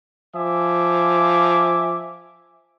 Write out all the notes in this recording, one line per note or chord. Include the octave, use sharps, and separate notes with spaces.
F3 E5 G#5 D6